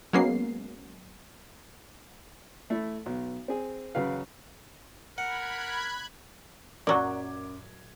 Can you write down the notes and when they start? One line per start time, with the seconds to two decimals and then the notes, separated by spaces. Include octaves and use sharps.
0.13 F#3 G#3 A#3 B3 C#4 C7
2.70 A3 E4
3.06 B1
3.48 C4 G#4
3.95 F#2 C#3 B4 F5
5.18 A#4 F#5 B5 F#6 G#6
6.87 F#2 A#2 F#3 D5 F#5 D6 G#6